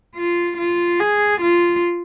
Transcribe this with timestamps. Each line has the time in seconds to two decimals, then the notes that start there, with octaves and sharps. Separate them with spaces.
0.16 F4
0.57 F4
1.00 G#4
1.41 F4